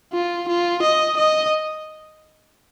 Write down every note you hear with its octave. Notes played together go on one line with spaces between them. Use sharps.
F4
F4
D#5
D#5